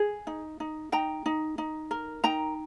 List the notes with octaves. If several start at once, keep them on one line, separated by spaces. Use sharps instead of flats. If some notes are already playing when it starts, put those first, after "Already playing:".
Already playing: G#4
D#4
D#4
D#4 G5 A#5
D#4
D#4
A#4
D#4 G5 A#5